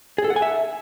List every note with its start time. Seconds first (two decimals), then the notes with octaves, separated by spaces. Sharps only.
0.18 G#4
0.24 A4
0.30 F#5
0.36 G#5
0.42 E5